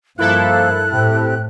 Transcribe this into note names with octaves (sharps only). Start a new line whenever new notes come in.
G2 F3 A#3 E4 A4 F#6
A2 C4 G4